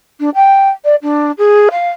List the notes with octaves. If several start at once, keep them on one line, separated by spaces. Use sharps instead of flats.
D4
G5
D5
D4
G#4
F5